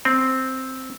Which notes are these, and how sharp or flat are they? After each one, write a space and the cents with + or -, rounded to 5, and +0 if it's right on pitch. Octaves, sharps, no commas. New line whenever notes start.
C4 +0